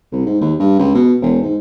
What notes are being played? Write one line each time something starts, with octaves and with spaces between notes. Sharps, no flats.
C2
G#2
D#2
G2
C#2
B2
E1
G#2